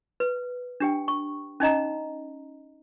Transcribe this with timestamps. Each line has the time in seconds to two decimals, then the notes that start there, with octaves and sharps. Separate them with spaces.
0.20 B4
0.80 D4 G4 G5
1.08 C#6
1.60 C#4 D#4 D#5 A#5